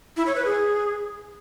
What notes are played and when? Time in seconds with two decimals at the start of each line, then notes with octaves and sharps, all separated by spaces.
0.17 E4
0.26 C#5
0.36 B4
0.45 G#4